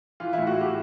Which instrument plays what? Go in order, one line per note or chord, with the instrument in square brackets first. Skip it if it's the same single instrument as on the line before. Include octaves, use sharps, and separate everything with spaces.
[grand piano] E3 F4
E4
A2
F#4
A2 G4